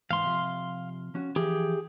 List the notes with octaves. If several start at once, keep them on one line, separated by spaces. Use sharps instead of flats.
E2 G#2 F5 C6
C3 F3
F3 C#4 F#4
E3 F3 G4 G#4